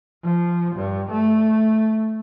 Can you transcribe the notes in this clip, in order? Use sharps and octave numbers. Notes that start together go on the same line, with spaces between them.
F3
G2
A3